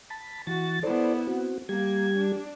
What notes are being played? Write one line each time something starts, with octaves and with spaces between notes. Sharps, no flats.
A5 B5
E3 F#4 A6
B3 E4 A4 C5 D5
C4 F#4
G3 A#3 G4 G#6
D4